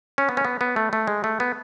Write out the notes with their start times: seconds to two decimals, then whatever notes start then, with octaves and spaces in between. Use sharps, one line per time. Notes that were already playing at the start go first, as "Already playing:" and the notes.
0.18 C#4
0.29 B3
0.37 C#4
0.45 B3
0.61 B3
0.76 A3
0.93 A3
1.07 G#3
1.24 A3
1.40 B3